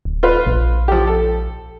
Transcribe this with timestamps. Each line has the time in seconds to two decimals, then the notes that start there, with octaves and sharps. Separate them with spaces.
0.05 D1
0.23 F4 B4
0.46 A#1
0.88 F3 G4
1.07 A4